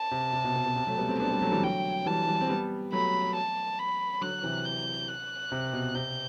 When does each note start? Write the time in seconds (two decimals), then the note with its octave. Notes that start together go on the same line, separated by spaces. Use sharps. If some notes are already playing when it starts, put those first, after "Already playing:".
Already playing: A5
0.11 C3
0.33 C3
0.45 B2
0.56 B2
0.66 B2
0.76 C3
0.87 F#3 A3
0.98 G3 B3
1.08 A3 C4
1.19 B3 D4 A5
1.30 G3 B3
1.41 F#3 A3
1.52 E3 G3
1.62 D3 F#3 G5
2.06 E3 G3 A5
2.27 E3 G3
2.41 C4
2.49 G3 B3
2.92 F#3 A3 B5
3.36 A5
3.79 B5
4.21 D3 F#3 F#6
4.43 C3 E3
4.65 G6
5.08 F#6
5.52 C3
5.73 B2
5.95 C3 G6